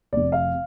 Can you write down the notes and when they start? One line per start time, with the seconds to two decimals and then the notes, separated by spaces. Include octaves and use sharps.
0.13 F1 F2 C3 D5
0.32 F5